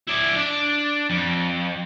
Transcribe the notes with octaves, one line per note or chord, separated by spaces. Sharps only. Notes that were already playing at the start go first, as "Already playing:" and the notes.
E4 D5
D4
F2